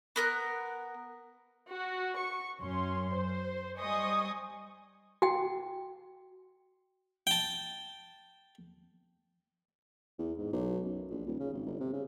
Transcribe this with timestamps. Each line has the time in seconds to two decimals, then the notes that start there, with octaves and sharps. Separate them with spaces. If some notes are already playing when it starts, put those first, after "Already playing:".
0.16 B3 A#4 F#6
1.70 F#4
2.18 C#6
2.61 F#2 C#4 C6
3.15 C5
3.79 G3 C5 D#5 G#5 C#6 D#6
5.22 F#4 G5
7.27 G5 A5
10.18 E2
10.38 G#2
10.53 B1
10.85 F#2
11.10 A#1
11.26 D#1
11.40 C#3
11.53 G#1
11.66 G1
11.80 C3
11.93 C#3